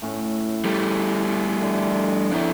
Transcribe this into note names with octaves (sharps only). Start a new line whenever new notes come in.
A2 C#4
G3 A3
D3
F2 E4 C#5 G5